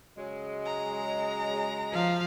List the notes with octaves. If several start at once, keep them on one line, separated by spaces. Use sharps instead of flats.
C#3 F#3 G#3
A#5
F3 F5